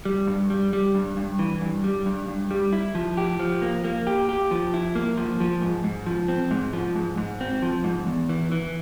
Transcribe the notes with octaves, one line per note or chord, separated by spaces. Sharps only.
G3
G2
G3
G3
G2
G2
E3
G2
G3
G2
G2
G3
E4
F3
G4
F3
A#3
A#3
G4
G4
F3
E4
A#3
F3
F3
G#2
G#2
F3
C4
G#2
F3
G#2
G#2
C4
F3
G#2
E2
E3
E3